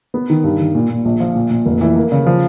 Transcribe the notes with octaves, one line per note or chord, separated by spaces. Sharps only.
B3
D#3
G2
D#3
A#2
A#2
A#1
F3
A#2
A#2
F1
E3
A#3
C#3
F3